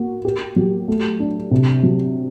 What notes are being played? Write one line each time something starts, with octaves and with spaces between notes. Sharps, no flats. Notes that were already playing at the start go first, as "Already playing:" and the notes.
Already playing: A#3 F#4
G4
F#3
A3
D4
C3
F#3